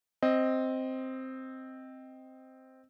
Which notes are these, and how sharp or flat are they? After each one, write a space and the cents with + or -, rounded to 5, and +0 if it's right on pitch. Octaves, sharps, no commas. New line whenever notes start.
C4 +0 D#5 +5